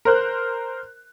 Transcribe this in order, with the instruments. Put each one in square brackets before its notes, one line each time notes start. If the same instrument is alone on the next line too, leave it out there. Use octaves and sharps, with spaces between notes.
[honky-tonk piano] A#4 C5 F#6